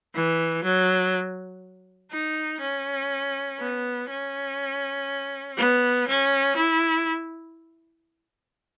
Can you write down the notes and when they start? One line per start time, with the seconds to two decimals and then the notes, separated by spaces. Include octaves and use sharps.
0.14 E3
0.64 F#3
2.12 D#4
2.61 C#4
3.59 B3
4.10 C#4
5.57 B3
6.08 C#4
6.56 E4